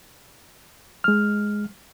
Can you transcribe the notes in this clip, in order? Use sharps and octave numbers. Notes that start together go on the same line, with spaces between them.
G#3 F6